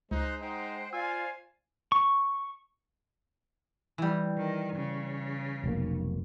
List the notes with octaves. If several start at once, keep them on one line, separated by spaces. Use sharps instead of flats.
C#2 G#3 D#4 C5 F#6
D#4 C5 F#5 G5
F4 C5 D5 F5 G#5 E6
C#6
E3 G3
D#3
C#3
F1 B1 A#3